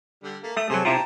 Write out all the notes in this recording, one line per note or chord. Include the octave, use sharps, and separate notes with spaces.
D3 G3
A3 A#3
A3 D#6
C3 F#3 G#4 A4 A5
C3 E4 F4 G5 A5 A#5